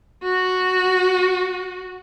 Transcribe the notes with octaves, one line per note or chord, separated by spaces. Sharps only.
F#4